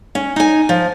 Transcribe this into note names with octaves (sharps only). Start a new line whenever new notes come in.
C#4
D#4 G#5
F3